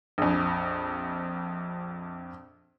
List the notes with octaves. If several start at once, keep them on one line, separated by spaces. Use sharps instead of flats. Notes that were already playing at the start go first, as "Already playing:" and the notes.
A#1 F2